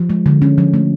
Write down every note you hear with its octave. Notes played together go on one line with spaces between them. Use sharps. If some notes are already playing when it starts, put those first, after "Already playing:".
Already playing: F3
G#3
D3
C#4
F3
A3